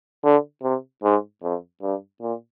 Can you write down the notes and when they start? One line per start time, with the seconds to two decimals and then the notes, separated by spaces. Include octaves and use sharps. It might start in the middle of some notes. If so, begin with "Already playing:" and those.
0.24 D3
0.63 C3
1.03 G#2
1.43 F2
1.82 G2
2.21 A#2